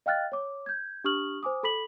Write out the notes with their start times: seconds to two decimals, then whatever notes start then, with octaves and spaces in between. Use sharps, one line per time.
0.06 D#5 F5 G5 F6 F#6 A6
0.32 C#5 D6
0.66 G6 G#6
1.04 D4 G4 C#6 D#6 F6 F#7
1.43 C5 G#5 D6 D#6
1.63 A4 B5 B6 F#7